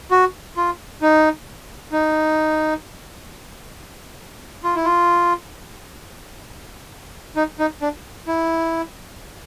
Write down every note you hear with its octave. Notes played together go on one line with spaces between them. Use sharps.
F#4
F4
D#4
D#4
F4
E4
F4
D#4
D#4
D4
E4